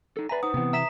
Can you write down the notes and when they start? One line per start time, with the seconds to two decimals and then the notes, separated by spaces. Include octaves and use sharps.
0.17 D#4 A4
0.29 B4 D5 E5 G#5 A#5
0.43 D#4 C5 F#5 D#6
0.54 C3 E3 B3 C4 F#5
0.73 E5 A#5 B6 E7